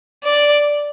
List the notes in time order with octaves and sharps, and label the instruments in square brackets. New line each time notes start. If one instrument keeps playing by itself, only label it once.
[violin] D5